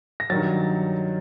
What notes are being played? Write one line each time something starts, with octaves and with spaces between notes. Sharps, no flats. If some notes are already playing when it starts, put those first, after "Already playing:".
A#6
G2 D#3 F#3 A6